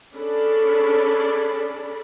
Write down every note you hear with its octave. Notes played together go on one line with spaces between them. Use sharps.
C#4 D4 G#4 A4 D5 B5